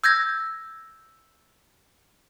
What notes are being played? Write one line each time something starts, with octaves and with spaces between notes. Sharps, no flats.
E6 G6 G#6 A#6